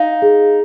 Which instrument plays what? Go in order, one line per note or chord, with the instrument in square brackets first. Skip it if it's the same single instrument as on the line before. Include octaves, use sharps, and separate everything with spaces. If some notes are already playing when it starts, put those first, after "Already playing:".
Already playing: [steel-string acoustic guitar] D#4 [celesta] F5
[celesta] G#4